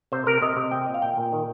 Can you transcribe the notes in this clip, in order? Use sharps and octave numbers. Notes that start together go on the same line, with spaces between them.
C3 C5
C3 A#4
C3 D#5
C3
C4 G5
A#2 D#5
F5
A#2 G5
A#2
D#3